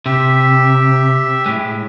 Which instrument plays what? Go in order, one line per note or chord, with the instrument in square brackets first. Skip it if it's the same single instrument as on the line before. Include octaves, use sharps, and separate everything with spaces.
[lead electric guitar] C3 [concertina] G4 E5
[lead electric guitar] A2 G#3